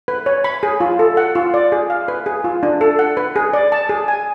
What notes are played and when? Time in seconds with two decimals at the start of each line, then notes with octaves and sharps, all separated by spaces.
0.08 B4
0.26 C#5
0.44 B5
0.63 G#4
0.80 F4
0.99 A4
1.17 F#5
1.35 F4
1.54 D5
1.72 G#4
1.90 F5
2.08 B4
2.26 G#4
2.44 F4
2.63 D4
2.81 A4
2.99 F#5
3.17 B4
3.36 G#4
3.53 D5
3.72 A5
3.89 G#4
4.08 G#5